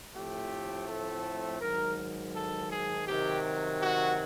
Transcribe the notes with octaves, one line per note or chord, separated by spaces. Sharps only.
A2 F3 A3 C4 G4
A4
G#2 D#3 F#3 A#4
A4
G#4
C3 D#3 F#3 G4
F#4